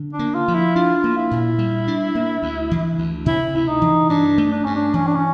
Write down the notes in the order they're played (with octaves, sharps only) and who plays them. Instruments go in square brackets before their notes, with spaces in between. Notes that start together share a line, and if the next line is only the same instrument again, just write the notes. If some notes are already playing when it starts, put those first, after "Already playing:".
Already playing: [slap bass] D3
[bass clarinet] D4
[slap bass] A#3
[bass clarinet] F4
[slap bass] F3
[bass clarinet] E4
[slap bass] D4 [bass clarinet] F4
[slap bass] A#3
[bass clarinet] E4
[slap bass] A#2
G3
D4
A#3
D2
E3
D2
[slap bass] C3 [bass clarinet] E4
[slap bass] D2 [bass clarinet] E4
[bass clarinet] D#4
[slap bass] E3
[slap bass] G2 [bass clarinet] D4
[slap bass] A3
[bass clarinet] D4
[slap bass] G2 [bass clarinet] C#4
[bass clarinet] D4
[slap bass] E3 [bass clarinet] C#4
[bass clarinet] D4
C#4